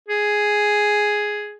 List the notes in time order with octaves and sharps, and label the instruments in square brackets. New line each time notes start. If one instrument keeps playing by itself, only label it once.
[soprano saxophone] G#4